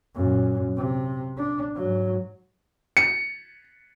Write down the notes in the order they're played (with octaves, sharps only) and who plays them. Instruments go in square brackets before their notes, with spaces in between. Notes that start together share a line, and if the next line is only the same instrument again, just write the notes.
[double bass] F#2 A#2
C3
D4
G#2 F#3
[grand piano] C#7